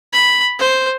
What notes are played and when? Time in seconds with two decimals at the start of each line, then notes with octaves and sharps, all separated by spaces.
0.13 B5
0.59 C5